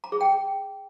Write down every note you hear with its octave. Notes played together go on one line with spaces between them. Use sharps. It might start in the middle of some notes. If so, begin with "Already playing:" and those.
A#5
G#4
G5